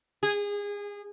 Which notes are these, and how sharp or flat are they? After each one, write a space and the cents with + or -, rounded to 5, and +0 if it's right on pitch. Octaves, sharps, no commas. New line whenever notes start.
G#4 -25